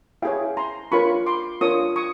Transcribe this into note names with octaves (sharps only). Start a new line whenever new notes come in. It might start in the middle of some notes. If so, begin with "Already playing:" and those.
E4 G#4 C#5 F5 G5
A#5 C6
D4 F4 A#4 C#5 B5 C#6
C6 D6
D4 F4 A#4 C#5 C#6 D#6
C#6 D#6